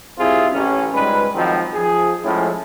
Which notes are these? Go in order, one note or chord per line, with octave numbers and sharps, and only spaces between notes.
C2 C3 E4 F4 G#4 C5
A1 C#4
C#2 G#2 G3 G#3 B4
D#3 F3 F#3 G#3 C4
F3 G#4
A2 F3 G#3 A3 C#4 E4